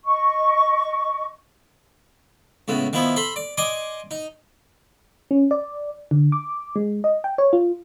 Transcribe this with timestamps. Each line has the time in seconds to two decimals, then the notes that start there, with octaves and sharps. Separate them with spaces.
0.05 D#5 C#6
2.68 C#2 A2 B3
2.93 D#3 F3 B3 E4
3.16 A4 B5 C6
3.36 D5
3.57 D5 D#5 G#5 C6 D6 D#6
4.11 D#4
5.31 C#4
5.51 D5
6.11 D3
6.32 D6
6.76 G#3
7.04 D#5
7.24 G5
7.38 C#5
7.53 F4